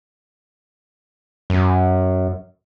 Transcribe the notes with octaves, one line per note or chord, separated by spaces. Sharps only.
F#2